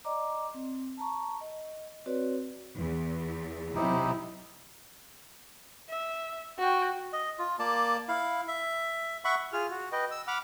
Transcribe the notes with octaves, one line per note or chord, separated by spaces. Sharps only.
D5 D#5 A#5 D6
C4
A5 A#5 C#6
D#5
C4 F#4 B4 C#5 D5
E2
C3 F#3 D#4 E4 G4
E5
F#4 G5
D#5
F4
A#3 D5 A5
E4 F5
E5
E5 F#5 B5 C#6
F4 G#4 F6
F#4
B4 D#5 G5
E6
F#5 B5 D6 F6